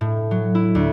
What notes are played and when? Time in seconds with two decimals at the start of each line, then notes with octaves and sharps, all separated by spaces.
0.01 A2
0.31 F#3
0.55 E4
0.75 D2